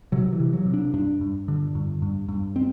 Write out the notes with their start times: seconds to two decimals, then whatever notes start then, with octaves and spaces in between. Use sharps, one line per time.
0.12 C3 F#3
0.33 E3
0.40 C3
0.53 F#3
0.66 C3
0.74 D4
0.94 G2 D4
1.21 G2
1.48 D3
1.75 G2
2.02 G2
2.28 G2
2.56 C4